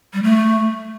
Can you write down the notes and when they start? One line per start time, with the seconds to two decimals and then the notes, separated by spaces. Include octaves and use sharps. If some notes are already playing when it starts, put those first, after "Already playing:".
0.14 G3
0.23 A3